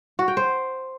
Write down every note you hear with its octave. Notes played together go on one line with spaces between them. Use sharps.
F#4
G5
C5